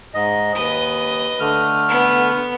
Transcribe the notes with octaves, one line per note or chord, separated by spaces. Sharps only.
G#2 D#5
D#2 B4 D#5
D3 A3 F6
B3